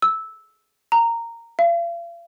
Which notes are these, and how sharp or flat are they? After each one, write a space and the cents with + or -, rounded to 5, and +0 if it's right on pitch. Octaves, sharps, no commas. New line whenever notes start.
E6 -10
A#5 -10
F5 -40